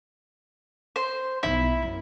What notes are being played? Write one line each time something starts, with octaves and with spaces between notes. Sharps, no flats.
C5
B1 D#4 E4
F#2